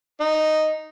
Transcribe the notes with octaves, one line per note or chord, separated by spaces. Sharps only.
D#4